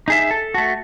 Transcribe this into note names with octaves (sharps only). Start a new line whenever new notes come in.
D#4 G#4 E5
A4
A3 F#4